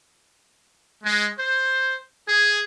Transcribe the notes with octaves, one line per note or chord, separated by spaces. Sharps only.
G#3
C5
G#4